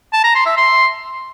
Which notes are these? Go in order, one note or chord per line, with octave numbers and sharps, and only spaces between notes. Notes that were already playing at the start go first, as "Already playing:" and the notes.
A5
A#5
C6
E5
C6